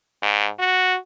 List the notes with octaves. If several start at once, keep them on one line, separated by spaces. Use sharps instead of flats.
G#2
F#4